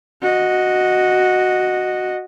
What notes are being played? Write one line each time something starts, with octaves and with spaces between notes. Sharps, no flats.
F#4 D#5